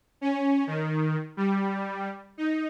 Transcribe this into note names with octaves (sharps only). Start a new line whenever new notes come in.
C#4
D#3
G3
D#4